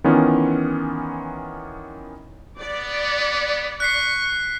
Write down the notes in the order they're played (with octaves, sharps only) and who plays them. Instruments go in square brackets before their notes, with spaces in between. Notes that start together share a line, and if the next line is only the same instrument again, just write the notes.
[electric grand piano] D#3 E3 B3 C#4 F4
[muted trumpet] B3 [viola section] D5
[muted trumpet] C#6 [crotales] F#6 B6 C7